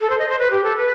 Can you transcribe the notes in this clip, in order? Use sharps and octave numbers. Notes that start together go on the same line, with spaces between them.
A4
C5
D#5
C5
B4
G4
A4
B4